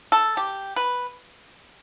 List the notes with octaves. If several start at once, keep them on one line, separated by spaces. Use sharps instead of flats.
A4
G4
B4